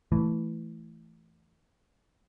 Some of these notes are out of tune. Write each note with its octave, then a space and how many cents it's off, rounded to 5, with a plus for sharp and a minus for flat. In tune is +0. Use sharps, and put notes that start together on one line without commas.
E3 +0 A3 +0